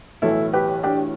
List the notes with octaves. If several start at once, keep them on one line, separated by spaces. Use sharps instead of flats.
B1 A2 E3 E4 A4
G4 B4
D4 G4